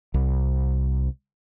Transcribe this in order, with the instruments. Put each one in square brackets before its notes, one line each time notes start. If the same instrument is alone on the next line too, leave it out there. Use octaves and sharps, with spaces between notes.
[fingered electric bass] C2